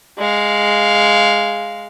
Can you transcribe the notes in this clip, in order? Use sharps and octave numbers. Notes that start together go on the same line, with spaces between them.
G#3 F5